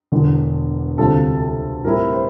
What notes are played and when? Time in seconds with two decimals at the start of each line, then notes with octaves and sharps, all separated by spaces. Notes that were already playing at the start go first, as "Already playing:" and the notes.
0.12 E1 E2 D3
0.98 D2 C3 G3 C4 F4 A4
1.41 A4
1.84 A2 G3 C4 E4 A#4
2.12 C5